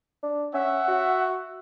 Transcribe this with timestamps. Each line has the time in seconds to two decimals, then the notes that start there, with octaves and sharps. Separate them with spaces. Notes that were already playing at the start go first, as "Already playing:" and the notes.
0.23 D4
0.54 C#4 E5 F#5
0.88 F#4